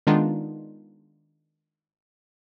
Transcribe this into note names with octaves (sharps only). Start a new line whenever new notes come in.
D#3 G#3 B3 D4 D#4 F4